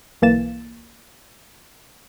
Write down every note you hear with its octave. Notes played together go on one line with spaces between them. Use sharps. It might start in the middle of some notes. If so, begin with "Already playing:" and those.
B1 E3 A#3 A6 E7